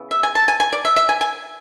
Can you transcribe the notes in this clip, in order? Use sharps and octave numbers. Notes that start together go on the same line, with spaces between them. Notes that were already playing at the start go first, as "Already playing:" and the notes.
Already playing: C#3 E3 B3
E5
G#5
A5
G#5
G#5
D5
E5
E5
G#5
G#5